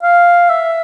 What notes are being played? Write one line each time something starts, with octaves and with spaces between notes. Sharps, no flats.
F5
E5